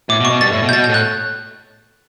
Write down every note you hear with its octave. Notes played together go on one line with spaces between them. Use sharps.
A2 D6
B2
C#6
B2
G2 A6
A2
B2
G6
B2 A6
G6
A2
F#6